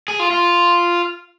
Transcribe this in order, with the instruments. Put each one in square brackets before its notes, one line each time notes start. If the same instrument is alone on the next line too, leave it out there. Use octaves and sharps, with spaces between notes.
[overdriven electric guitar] G#4
F4
F4